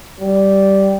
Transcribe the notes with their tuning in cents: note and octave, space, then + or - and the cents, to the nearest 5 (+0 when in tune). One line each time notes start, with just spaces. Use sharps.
G3 -5